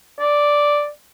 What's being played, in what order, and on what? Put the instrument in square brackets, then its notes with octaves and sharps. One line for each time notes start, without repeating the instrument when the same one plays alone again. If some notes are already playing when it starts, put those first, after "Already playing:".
[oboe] D5